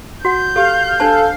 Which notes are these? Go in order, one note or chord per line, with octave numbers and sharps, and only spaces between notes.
F#4 F#5 G6
G4 A4 F5
D4 A4 C5 A5